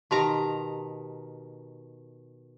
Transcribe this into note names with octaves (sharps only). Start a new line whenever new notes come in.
B2 D#3 G4 A5 A#5 C6